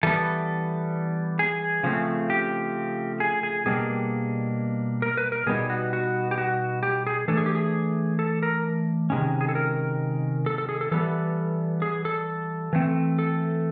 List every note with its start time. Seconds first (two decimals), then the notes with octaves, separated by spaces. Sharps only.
0.03 E3 G3 B3 A4
1.39 G#4
1.83 C#3 F3 A3 C4
2.30 G4
3.20 G#4
3.43 G#4
3.66 B2 G3 A#3 D4 G#4
5.02 A#4
5.17 B4
5.32 A#4
5.46 B2 G3 B3 D#4 G#4
5.70 F#4
5.93 F#4
6.31 G4
6.38 F#4
6.83 G4
7.07 G#4
7.28 E3 A3 D4 A4
7.37 G#4
7.46 G4
7.55 G#4
8.19 A4
8.43 A#4
9.10 C3 D#3 G#3 C#4
9.41 G#4
9.49 A4
9.55 A#4
10.46 A4
10.58 A4
10.69 G#4
10.81 A4
10.91 E3 G3 B3 A4
11.82 G#4
12.05 A4
12.73 E3 A3 C4
13.19 A4